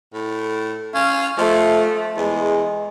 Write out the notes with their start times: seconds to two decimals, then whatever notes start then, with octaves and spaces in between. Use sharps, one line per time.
0.13 A2
0.95 C#4 F5
1.38 F3 A3
2.17 E2 G#3